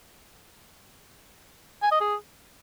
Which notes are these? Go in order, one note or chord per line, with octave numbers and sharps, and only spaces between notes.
G#5
D#5
G#4